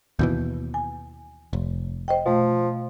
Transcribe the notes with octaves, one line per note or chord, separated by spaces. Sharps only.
D#2 B2 E3 G6
G#5
F1
C5 D#5 G5
B2 F3 A3